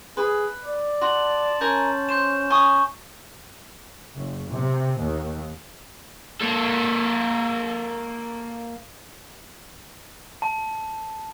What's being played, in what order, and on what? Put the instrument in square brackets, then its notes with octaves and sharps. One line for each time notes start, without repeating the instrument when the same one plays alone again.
[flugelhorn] G#4 [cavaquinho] B4
[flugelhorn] D5
[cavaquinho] F#4 [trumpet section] A5 [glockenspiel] C6 F#7
[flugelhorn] C#4 [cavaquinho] A#4 G#5 A#5 [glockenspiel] G6
[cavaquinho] C5 [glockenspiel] G6 E7
[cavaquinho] G#5 D#6 [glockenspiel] C#6
[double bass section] F#1
C3
D#2
[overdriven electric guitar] A#3 A4
[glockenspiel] A5